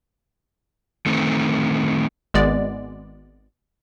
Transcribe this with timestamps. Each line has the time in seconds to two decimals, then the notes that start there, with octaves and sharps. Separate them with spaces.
1.06 D#3 A3 C4
2.34 G#1 G#3 B3 D5